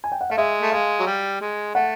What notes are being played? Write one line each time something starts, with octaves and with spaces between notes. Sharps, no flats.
G#5
G5
F#5
A3 F5
G#3 E5
A3
G#3 F5
F#3
G3
G#3
A3 F#5